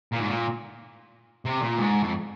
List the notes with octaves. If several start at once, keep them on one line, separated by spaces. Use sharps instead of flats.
A#2
G#2
A#2
C3
A#2
G#2
F2